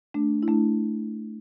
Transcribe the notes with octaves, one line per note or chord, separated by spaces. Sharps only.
A3 D4
E4
A3 D4